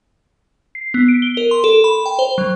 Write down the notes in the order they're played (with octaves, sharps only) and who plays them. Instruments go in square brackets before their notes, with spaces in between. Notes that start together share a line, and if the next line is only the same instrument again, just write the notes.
[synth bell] C7
B3
D7
G7
A#4
C6
A4
B5
G5
C5
F#3